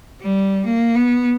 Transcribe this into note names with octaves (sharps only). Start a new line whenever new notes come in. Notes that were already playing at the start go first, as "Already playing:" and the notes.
G3
A#3
B3